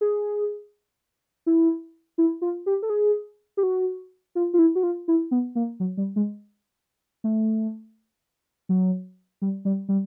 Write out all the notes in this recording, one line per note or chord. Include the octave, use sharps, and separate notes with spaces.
G#4
E4
E4
F4
G4
A4
G#4
G4
F#4
F4
F4
E4
F#4
F4
E4
B3
A#3
F#3
G3
G#3
A3
F#3
G3
G3
G3